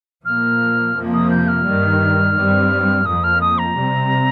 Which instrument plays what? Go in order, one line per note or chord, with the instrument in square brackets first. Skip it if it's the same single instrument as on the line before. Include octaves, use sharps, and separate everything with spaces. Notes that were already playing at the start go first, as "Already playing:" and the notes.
[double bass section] A#2 F3 A#3 [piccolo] F6
[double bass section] F2 C3 F3 A#3
[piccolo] D#6
G6
F6
[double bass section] G2 D#3 G3
G2 G3 C4
[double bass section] F2 F3 A#3 [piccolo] D#6
[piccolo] F6
D#6
A#5
[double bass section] C3 G3 C4